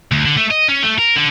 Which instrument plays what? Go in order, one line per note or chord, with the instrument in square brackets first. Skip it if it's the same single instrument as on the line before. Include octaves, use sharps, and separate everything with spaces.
[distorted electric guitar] D2
D3
A3
D#5
C#4
A3
A#4
D3